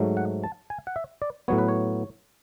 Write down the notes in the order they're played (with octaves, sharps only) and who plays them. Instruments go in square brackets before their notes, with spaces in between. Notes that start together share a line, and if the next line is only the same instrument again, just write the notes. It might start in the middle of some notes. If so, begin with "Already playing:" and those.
Already playing: [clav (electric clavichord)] G#2 F#3 A3
F#5
A5
G#5
F#5
E5
D5
A2 F#3 B3 C#5
B4
C#5